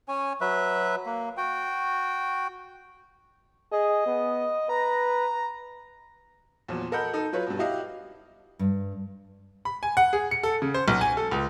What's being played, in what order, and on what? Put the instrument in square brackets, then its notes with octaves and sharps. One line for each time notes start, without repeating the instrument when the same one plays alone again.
[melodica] C#4 C#5 G#5
F#3 B4 E5
A#3
F#4 G5
[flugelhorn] G#4 [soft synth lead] D#5
[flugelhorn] B3
[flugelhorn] B4 [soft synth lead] A#5
[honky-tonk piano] E2 A#2 F3 F#3
A4 A#4 D#5 F#5 B5 G6
D#4 A4
F#3 F4 B4 C#5
G2 B2
E4 F#4 G4 D#5 F5
[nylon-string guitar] G2
[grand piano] B5
G#5
F#5
G#4
C#7
A4
C#3
C5
B1
G#5
A4
C#2